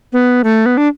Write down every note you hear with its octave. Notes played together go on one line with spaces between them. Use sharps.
B3
A3
B3
D4